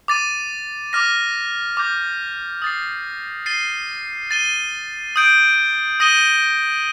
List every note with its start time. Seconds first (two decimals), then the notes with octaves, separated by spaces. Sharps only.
0.08 D6 A6 D#7
0.93 D6 F6 A#6
1.77 D6 G6 A#6
2.62 D#6 A6 C7
3.46 A6 C7 D#7 G7
4.31 A6 D#7 G7
5.16 D#6 G6 D7
6.00 D#6 A#6 D#7 G7